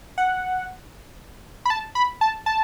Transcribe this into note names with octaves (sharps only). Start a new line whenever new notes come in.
F#5
B5
A5
B5
A5
A5